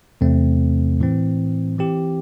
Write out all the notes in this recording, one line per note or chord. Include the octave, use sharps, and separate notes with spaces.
E2 C3 A3 C4
A2 E3 C4
E3 C4 G4